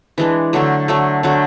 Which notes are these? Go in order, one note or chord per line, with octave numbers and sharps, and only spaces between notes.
E3 G#3 D4
D3 F#3 A3
D3 F#3 A3
D3 F#3 A3